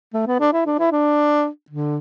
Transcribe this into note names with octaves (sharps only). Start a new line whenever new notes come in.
A3
B3
D4
E4
D4
E4
D4
D3